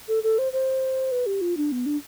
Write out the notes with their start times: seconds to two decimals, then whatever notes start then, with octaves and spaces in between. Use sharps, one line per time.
0.08 A4
0.23 A4
0.38 C5
0.53 C5
1.12 B4
1.26 G4
1.41 F4
1.57 D4
1.72 B3
1.86 D4